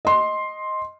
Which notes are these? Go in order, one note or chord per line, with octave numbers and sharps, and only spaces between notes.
D#5 C6